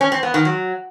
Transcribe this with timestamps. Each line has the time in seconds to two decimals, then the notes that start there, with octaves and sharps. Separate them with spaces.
0.01 C#4
0.12 C4
0.23 B3
0.34 D#3
0.45 F#3